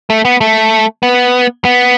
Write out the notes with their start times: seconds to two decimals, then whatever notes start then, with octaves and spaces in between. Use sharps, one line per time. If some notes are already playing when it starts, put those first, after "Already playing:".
0.10 A3
0.25 B3
0.41 A3
1.03 B3
1.65 B3